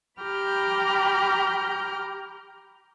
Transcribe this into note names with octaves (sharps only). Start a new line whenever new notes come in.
G4 G5 A#5 B5 F6 G6